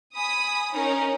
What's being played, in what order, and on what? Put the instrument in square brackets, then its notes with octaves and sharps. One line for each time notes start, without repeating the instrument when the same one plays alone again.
[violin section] G#5 B5 D#6
C#4 D#4 A#4